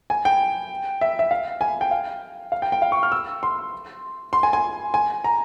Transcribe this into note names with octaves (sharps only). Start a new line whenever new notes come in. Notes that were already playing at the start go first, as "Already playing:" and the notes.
G#5
G5
E5
E5
F5
G#5
G5
F5
F5
G5
G5
F5
C#6
F6
E6
C6
C6
G#5
G#5
G#5
A#5